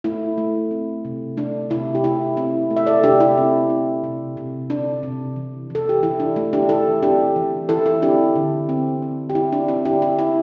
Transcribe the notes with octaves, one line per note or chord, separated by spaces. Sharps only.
A3 E4
A3
C4
C3
A3 D4
C3 E4
G4
A3 E4
C4 E4
A3
E5
A4 D5
C3 D4 G4
E4
C4
C4
C3
C3
C3 D4
C3
E3
E3 A4
G4
E3 E4
D4
A3 E4
D4 G4
E3 E4 A4
C4 D4 G4
E3
E3 E4 A4
E4
C4 D4 G4
D3
C4
C4
G4
C4 E4
D4
C4 E4
D4 G4
C4 E4
E4